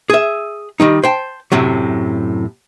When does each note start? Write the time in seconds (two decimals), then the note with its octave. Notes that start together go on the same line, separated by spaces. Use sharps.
0.10 G#4 E5
0.80 D#3 G3 D#4
1.04 C5 G5 A5
1.52 F#2 A2 C3 F#3